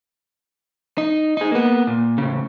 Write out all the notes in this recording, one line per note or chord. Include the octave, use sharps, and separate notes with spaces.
D#4
D#4 G#4
A#3 B3
A#2
A2 C#3